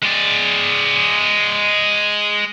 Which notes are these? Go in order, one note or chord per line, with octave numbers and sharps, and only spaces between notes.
G#3 D5